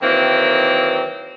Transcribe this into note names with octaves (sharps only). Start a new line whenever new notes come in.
D#3 E3 F#3 A#3 C4